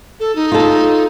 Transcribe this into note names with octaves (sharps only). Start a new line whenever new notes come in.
A4
D#4
F4 A4